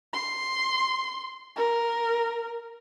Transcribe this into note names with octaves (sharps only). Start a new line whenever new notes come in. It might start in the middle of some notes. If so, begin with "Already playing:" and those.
C6
A#4